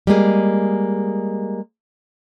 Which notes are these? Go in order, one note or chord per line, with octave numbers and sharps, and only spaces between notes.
G3 G#3 A#3 G#4